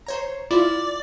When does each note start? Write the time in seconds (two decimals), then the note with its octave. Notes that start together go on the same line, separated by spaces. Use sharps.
0.07 C5 C#5 A#5
0.51 E4 F4 D5